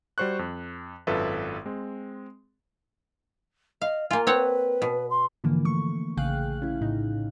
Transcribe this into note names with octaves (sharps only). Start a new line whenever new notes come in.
G3 F#4 C5 C#6 F#6
F2
G#1 F#2 F4 A4 B4 E5
G#3 C4
D#5 F5
A#3 F4 G#5
C4 B4 C#5 F#5
B2
C6
G#2 D3 E3 F3 A#3
A3 C#6
A#1 C#3 G#4 F5 G5 F#6
C#4 E4
A2 C#3 D#4